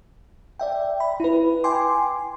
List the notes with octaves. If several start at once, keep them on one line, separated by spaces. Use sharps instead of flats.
D5 E5 G5
B5
E4 B4
G5 G#5 C6 D6